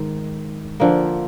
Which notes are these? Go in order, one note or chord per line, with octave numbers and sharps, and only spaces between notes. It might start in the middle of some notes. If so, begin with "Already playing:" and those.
Already playing: G#2 D#3
D3 F3 A#3